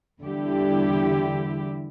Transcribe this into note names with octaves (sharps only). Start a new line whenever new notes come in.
E2 D3 G3 E4 G4